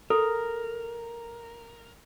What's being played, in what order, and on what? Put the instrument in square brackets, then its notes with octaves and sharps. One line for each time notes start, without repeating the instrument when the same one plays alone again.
[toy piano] A4 [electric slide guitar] A#4